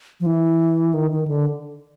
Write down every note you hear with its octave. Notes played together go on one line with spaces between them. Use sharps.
F3
E3
D#3
D#3
D3